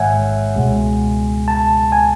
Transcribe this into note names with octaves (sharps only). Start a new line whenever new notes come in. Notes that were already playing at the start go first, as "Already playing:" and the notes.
Already playing: A1 G#2 D#3 G#3 C#5 E5 F#5 G#5
C#2 B2 G#3
A5
G#5